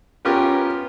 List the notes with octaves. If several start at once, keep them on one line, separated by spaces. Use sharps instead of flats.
B3 C#4 F4 G4 A#4